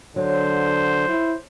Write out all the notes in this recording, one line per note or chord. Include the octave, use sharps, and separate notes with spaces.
D3 F#3 C5
E4